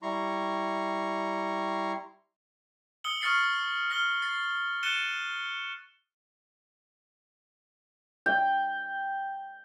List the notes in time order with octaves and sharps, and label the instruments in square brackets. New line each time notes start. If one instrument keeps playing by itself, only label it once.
[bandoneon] G3 E4 A#5 C6 C#6
[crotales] D#6 E6 C#7 F#7 G7
C#6 D#6 F6 A6 C7 C#7
F6 A#6 G7
A6 C7
F#6 A6 C#7 D#7 E7 G7
[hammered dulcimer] G5